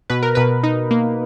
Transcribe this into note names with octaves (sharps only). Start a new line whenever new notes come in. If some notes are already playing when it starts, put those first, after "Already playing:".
B2 B4
A#4
B2 B4
D#4
A#3